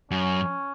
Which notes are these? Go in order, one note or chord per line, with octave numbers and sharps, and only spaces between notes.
F#2 C#4